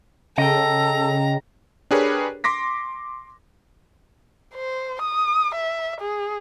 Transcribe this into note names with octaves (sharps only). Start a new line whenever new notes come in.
C#3 A4 D#5 G5 A#5
D4 G4 G#4 A#4 B4 C#5
C6 D6 A#6 B6
C5
D#6
E5
G#4